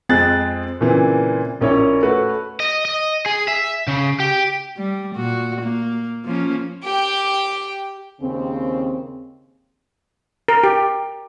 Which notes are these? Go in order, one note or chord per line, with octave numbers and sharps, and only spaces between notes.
F2 G#3 C4 G#4 F#6 A6
A#2 C#3 E3 C4
A#1 A#3 C#4 E4 C#5
A3 F#4 B4
D#5
D#5
G#4
E5
C#3
G4
G3
A#2 F#4
A#3
F3 A#3 C#4
G4 G5
D#2 C#3 C4
A#4
G4